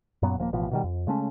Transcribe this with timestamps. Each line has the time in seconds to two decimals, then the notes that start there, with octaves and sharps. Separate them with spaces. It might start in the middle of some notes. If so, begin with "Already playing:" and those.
0.22 F#2 A#2 F#3 B3
0.38 D#1 F3 A3 A#3
0.53 A1 B2 F3
0.71 B2 D#3 G3
0.84 F2
1.07 C#3 G#3 A3 C#4